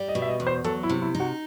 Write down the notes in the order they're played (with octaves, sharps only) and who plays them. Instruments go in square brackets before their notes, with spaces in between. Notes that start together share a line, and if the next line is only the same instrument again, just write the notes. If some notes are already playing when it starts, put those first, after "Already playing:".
Already playing: [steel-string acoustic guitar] G3
[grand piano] D#5
[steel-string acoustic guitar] B2
[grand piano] E5
D#5
[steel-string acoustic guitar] E2
[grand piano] C5
[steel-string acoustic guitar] F#3 [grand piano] A4
[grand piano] E4
[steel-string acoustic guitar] C3
[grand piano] E4
[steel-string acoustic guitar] D#4
[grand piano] F#4